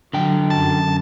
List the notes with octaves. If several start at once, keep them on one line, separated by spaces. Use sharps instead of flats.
D3 F#3 G5
F#2 A5